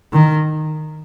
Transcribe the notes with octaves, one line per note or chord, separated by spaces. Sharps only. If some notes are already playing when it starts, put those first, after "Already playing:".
D#3